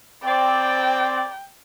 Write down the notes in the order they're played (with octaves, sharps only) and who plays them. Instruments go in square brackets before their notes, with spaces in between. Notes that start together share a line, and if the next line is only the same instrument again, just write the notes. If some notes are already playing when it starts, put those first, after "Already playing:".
[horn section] C4 D5 [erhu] G5